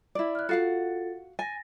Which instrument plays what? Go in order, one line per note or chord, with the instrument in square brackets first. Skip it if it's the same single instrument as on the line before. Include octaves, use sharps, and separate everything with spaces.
[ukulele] E4 D5
[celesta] F6 F#6
[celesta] F4 A4 A6 [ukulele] F#4 F5 F#5
[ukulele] G#5 [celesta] A6 A#6